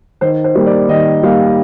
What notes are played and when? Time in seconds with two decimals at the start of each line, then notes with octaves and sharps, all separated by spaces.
0.21 D#3 C5
0.44 C5
0.55 G3 A#3
0.66 D5
0.89 D#3 D#5
1.23 G3 A#3 F5